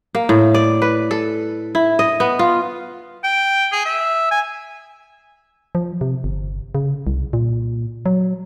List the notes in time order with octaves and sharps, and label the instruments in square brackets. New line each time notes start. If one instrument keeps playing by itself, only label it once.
[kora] A#3
A2
D5
B4
A4
E4
D#5
B3
F4
[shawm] G5
G#4
E5
G#5
[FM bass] F3
C3
G1
C#3
C2
A#2
F#3